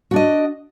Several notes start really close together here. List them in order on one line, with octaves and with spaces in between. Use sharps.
F#4 D4 D#5